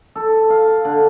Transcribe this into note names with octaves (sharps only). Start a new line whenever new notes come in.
A4
F5
D3